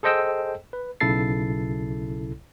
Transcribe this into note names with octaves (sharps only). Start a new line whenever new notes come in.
G#4 A4 C5 D#5 G5 E6
B4
B1 C#3 E4 A4 A6 C7